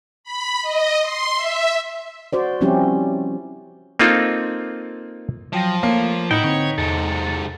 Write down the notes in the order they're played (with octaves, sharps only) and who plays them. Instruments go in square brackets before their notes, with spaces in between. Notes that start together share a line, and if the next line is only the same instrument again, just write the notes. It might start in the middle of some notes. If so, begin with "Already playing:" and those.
[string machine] B5
D#5
C6
E5
[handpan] F#4 C5 D5
F3 G3 C4 C#4 E4 G4
[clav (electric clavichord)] A#3 C4 D#4 F4 A4
[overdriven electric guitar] F3 [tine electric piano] F#3 G5 A#6
[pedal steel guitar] A3 [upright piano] A#3 [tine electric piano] C#5
[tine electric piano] A2 [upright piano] D#4 [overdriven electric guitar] E4 [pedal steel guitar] B4 F#5 G5
[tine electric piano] D3 C4 [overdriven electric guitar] C#5
[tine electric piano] E2 [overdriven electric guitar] G#2 C3 [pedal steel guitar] A4